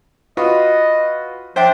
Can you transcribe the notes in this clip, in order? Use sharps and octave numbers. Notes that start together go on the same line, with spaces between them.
F4 F#4 B4 D#5
F3 D4 C5 E5 G5